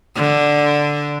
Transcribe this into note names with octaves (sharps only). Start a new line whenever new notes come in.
D3